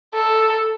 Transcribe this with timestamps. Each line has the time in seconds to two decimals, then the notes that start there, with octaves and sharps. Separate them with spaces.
0.14 A4